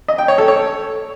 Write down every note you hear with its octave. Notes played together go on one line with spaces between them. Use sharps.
D#5
G5
C#5
A4
C#5